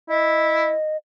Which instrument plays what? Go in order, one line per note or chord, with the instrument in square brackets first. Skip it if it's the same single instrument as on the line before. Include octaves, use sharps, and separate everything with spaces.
[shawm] E4 [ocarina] D#5